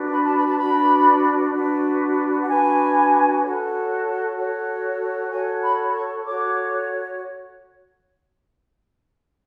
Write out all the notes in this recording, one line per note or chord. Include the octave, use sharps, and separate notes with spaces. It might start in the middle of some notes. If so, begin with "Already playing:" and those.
Already playing: D4 F#4 B4
B5
A5
B5
A5
D4 F#4 B4 B5
D4 F#4 B4
F#5
D4 F#4 B4 G#5
F#4 A4 C#5
F#4 A4 C#5
F#4 A4 C#5 G#5
B5
C#6
F#4 A4 C#5 D6